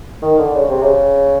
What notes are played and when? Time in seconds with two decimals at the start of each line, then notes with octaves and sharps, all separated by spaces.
0.22 D#3
0.38 D3
0.55 C#3
0.69 C3
0.83 C#3